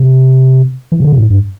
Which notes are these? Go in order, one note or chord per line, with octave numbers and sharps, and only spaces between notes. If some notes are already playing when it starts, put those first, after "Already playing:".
Already playing: C3
E3
C3
D3
C3
A2
G2